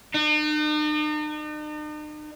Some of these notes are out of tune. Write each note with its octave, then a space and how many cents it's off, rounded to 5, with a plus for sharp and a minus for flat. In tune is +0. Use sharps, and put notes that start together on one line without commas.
D#4 -45